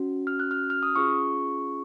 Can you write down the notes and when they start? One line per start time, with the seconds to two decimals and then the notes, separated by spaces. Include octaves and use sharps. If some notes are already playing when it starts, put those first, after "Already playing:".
Already playing: C#4 F#4
0.27 F6
0.40 F#6
0.51 F6
0.70 F6
0.83 D#6
0.96 C#4 F4 G#4 C#6